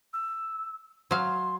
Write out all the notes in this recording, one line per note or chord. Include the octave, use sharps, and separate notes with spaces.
E6
F#3 F5 C6